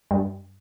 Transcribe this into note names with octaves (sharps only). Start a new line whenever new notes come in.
G2